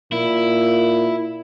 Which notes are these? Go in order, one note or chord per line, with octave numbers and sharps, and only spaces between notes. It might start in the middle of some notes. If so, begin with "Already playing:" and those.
A#2 E4